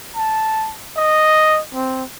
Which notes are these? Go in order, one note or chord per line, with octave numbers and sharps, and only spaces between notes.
A5
D#5
C4